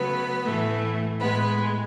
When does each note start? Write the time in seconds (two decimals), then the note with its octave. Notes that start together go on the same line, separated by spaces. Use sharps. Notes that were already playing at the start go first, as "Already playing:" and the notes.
Already playing: C#3 F#3 A3 B3 B4
0.45 A2 E3 A3
1.20 A2 G#3 B3 B4